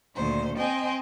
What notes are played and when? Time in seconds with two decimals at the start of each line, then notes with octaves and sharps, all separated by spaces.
0.15 D2 A#2 D#3 C5
0.57 C4 C5 D#5 G5 G#5